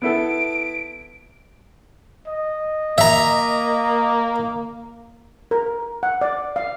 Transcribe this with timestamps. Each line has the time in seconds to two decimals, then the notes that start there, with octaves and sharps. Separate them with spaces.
0.02 B3 E4 A4 D7
2.28 D#5
2.98 A#3 E5 A#5
5.51 A#4
6.03 F#5
6.21 D5
6.56 F5